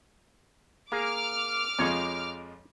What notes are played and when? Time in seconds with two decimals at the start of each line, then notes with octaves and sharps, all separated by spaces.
0.92 A#3 G#4 D6 F6
1.79 F2 F3 G#3 C#5